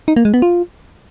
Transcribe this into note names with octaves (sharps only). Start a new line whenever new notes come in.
D#4
A#3
G#3
B3
F4